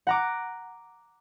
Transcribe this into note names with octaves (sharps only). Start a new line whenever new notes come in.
F#5 A#5 D6